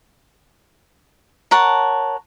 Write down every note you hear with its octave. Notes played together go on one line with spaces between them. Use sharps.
A#4 C#5 F#5 A5